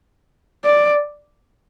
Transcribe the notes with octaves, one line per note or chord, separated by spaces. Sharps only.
D5